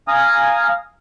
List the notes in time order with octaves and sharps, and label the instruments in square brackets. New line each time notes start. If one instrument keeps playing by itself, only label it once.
[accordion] F5 G#5 A#5 D#6 F6